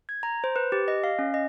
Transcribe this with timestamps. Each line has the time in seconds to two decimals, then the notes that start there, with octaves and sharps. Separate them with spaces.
0.09 G#6
0.23 A#5
0.44 C5
0.56 B4
0.72 G4
0.88 D#5
1.04 F5
1.19 C#4
1.34 D#5